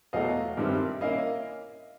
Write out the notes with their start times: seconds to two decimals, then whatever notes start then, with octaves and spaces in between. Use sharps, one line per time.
0.13 E2 B2 F#3 A3 D#5 F5
0.57 G2 D#3 G3 C4 E4
1.01 A#3 C#4 E4 D#5 F5